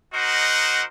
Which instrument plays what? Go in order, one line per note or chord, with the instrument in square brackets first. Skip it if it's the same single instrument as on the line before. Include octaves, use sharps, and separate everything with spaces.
[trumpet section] D#4 F#4 A#4 C5 D#5 F#5